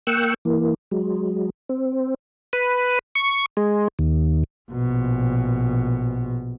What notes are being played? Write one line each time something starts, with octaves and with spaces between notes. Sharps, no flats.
A#3 G5 C#6 E6 F#6
E3 A#3
F#3 G#3
C4
B4
C#6
G#3
D#2
A#1 B2